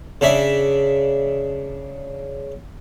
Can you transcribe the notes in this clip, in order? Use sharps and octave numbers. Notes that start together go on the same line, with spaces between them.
C#3 D4 E5